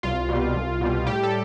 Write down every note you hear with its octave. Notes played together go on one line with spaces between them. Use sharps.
C2 F4
B2 G3
C2
B2 G3
A2 G3 G4
A4